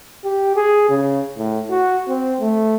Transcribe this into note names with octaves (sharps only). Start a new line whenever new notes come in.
G4
G#4
C#3
A2
F#4
C4
A3